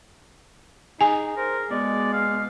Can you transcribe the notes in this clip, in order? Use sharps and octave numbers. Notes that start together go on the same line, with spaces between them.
D#4 G#4 G#5
A#4 C5
B2 G#3 B3 D5
F5